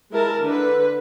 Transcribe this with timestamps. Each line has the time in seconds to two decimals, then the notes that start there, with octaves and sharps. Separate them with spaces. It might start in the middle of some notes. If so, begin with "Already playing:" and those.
0.11 G#3 E4 A#4 A5
0.43 D3 B4